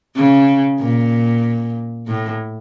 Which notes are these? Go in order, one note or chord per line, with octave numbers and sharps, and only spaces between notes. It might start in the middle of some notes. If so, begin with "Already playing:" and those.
C#3
A#2
A2